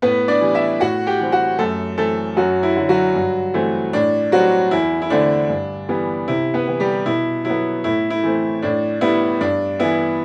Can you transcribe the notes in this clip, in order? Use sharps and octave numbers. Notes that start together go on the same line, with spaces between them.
A2 B3 B4
D4 D5
E3 G3
E4 E5
A2 F#4 F#5
G4 G5
E3 G3 C4
F#4 F#5
F#2 A3 A4
E3 A3 C4 A4
F#2 F#3 F#4
E4
D3 F#3
F#3 F#4
G2
E3 A3 C4
A2 D4
F#3 G3 C4 F#4
E2 E4
E4
D3 A3 C4 D4
G2
E3 G3 B3
C3 E4
B3 B4
E3 B3
G3 G4
B2 E4
F#3 B3 E4
A2 E4
E4
E3 A3 C4
A2 D4
G3 B3 E4
G2 D4
E3 B3 E4